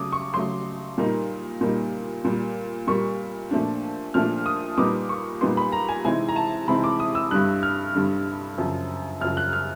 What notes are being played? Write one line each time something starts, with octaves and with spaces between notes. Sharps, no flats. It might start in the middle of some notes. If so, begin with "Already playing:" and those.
Already playing: C#3 F#3 A3 D6 D#6
C#6
C#3 F#3 A3 C6
A#2 G3 A#3 D#4
A#2 G3 A#3 D#4
A#2 G3 A#3
A#2 G3 A#3 C#6
A#2 F3 A3 D4
A#2 F3 A3 D4 F6
D#6
A#2 G3 B3 D#4 D6
C#6
A#2 G3 B3 D#4 C6
B5
A#5
G#5
C3 E3 G#3 C4 D#4 G#5
A#5
A5
C3 E3 G#3 C4 D#4 B5
D6
D#6
E6
G2 D3 G3 F#6
F6
G2 D3 G3
F#2 C#3 F3
F#2 C#3 F3 F6
F#6
F6